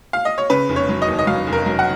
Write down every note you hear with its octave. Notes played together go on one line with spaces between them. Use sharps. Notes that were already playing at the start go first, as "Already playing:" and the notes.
F5
D#5
C#5
C#3 B4
F1
C#5
F#3
D#5
D#2
D#5
F#3 F5
F1
A#4
F#3
F#5